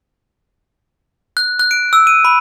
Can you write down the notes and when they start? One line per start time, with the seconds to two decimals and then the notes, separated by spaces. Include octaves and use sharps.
1.37 F#6
1.59 F#6
1.71 D7
1.93 E6
2.07 D#7
2.25 B5